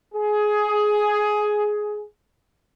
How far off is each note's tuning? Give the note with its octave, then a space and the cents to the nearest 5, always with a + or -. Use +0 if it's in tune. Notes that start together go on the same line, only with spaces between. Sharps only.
G#4 +15